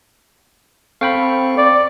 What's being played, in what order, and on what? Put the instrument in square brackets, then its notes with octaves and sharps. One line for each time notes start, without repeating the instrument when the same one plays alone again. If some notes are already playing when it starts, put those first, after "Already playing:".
[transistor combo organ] C4 A4 C#6 [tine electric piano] F5 G5 B5
[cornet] D5